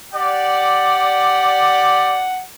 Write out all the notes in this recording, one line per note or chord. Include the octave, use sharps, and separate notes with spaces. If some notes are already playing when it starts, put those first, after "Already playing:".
G4 D5 F#5